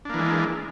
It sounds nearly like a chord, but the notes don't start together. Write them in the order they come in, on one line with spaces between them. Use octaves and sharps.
D4 A#3 E3 G#3